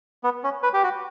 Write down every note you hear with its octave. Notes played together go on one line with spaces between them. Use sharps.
B3
C#4
B4
G4
F#4